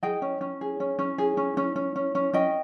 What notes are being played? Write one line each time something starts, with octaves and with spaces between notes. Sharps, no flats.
G#4 D#5 G5
C#4
C#4
G#4
C#4
C#4
G#4
C#4
C#4
C#4
C#4
C#4
C#4 D#5 G5